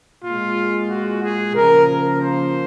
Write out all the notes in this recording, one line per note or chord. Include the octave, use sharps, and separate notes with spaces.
A#2 G#3 F4
F#4
G#4
C#3 F3 A#3 A#4
A#4
C5